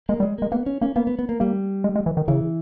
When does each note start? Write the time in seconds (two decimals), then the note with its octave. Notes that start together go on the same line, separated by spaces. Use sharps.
0.09 G#3 A#3
0.20 G3
0.22 G#3
0.38 G#3 A#3
0.52 A#3 B3
0.66 C#4
0.81 A#3 C#4
0.96 A#3 B3
1.07 B3
1.19 B3
1.29 A#3
1.40 G3 A#3
1.84 G#3
1.96 G#3
2.06 E3
2.17 D#3
2.28 C#3 E3